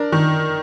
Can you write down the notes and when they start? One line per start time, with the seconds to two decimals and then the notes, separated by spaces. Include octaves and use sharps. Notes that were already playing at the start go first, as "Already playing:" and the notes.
Already playing: D4 A#4
0.12 D#3